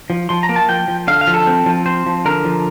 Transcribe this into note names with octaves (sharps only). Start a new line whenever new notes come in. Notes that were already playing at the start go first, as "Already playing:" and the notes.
F3
F3 C6
A#5
A#3
A5
F3 G5
F3
D3 F5
F5
F3
A4
C4
F3
C4 C5
F3
D3 A#4
F3